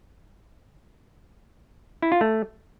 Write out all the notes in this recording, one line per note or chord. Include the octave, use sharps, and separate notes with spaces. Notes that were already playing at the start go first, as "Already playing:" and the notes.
E4
F4
A3